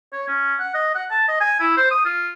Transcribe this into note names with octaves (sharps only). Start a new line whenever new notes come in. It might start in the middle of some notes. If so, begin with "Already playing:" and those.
C#5
C#4
F#5
D#5
F#5
A5
D#5
G#5
E4
C5
D#6
F4